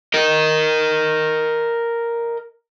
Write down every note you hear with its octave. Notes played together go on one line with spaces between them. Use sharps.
A#4 D#5